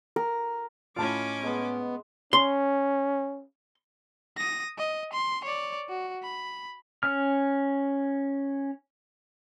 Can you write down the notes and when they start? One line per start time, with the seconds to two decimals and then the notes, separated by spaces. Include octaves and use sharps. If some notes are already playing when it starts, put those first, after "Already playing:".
0.16 A#4
0.96 A2 C#4 F4 D#5 A5 B5 D6
1.42 G#3 B3 C6
2.33 C#4 C6
4.37 D#6 A#6
4.78 D#5
5.13 C6
5.44 C#5 D5
5.89 F#4
6.22 B5
7.03 C#4 F6